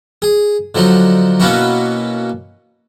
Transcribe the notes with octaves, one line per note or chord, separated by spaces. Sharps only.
G#4
D3 F3 F#3 D#4
B2 A#3 B3 C#4 E4 F#4